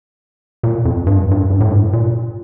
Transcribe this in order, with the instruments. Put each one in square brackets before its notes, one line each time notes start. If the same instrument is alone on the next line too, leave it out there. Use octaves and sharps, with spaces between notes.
[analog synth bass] A#2
F2
G2
F2
G2
G2
A2
G2
A#2